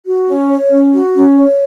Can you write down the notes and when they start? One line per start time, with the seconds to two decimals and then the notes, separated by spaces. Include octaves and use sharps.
0.05 F#4
0.27 C#4
0.49 C#5
0.71 C#4
0.93 F#4
1.15 C#4
1.38 C#5